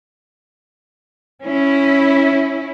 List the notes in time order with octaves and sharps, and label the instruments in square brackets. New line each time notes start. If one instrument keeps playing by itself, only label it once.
[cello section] C#4 E4